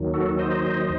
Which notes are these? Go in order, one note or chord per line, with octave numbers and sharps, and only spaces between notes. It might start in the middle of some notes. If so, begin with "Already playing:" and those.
Already playing: D#2 D#3 F#3
F#4 A4
C5 D#5